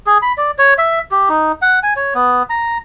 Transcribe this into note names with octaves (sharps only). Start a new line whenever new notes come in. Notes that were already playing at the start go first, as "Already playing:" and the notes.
G#4
B5
D5
C#5
E5
G4
D#4
F#5
G#5
C#5
B3
A#5